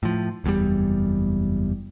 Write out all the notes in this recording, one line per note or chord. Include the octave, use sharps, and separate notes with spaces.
A2 F3
F#1 E2 A2 G3